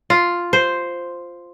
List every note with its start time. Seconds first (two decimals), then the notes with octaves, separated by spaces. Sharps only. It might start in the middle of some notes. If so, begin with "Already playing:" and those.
0.10 F4
0.53 C5